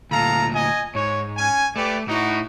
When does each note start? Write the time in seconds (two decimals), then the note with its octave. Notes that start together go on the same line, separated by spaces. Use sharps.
0.11 D2 A#2 A4 F5 A#5
0.54 D#5 G#5
0.95 G#2 C#5
1.38 C#4 G#5
1.76 A3 G4 B4 D5
2.08 A2 D#4 E4 F#4